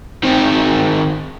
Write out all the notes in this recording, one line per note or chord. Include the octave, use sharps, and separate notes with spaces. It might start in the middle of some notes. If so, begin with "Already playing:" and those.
D#3 C4